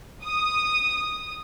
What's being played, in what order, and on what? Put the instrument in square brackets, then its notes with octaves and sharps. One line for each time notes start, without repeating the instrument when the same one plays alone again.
[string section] D#6